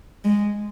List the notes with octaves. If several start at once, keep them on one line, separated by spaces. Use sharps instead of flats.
G#3